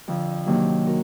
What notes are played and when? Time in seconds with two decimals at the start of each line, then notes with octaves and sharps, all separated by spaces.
0.08 F2 D3 F3
0.46 C3 D#3 F#3 A#3 D4
0.87 F#4 A#4